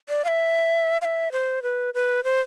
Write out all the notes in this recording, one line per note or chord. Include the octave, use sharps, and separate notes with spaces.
D5
F5
E5
F5
E5
C5
B4
B4
C5